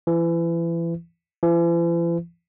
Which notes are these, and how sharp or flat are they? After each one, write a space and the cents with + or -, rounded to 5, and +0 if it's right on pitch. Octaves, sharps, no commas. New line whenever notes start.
E3 +30
E3 +45